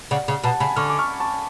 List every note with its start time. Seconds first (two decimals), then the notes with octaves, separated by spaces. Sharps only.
0.11 C#3 D5 F#5
0.28 C#3
0.44 B2 F#5 A5
0.60 C#3 G#5 B5
0.76 D3 C#6 F6
0.90 D6
0.98 C#6 F6
1.20 A5 C#6